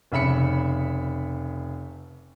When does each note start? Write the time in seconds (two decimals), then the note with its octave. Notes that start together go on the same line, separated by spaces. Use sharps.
0.12 F1 C#3 E5 B5 C#7